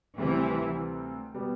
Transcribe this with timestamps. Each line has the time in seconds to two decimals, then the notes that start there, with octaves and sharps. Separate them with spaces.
0.18 D2 C3 E3 G3 C4
1.34 B2 G3 B3